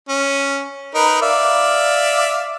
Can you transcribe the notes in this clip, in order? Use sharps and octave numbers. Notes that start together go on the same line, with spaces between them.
C#4
D#4 A#4 B4
D5 E5 F5